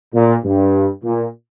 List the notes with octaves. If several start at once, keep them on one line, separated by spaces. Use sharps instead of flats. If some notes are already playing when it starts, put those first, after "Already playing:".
A#2
G2
A#2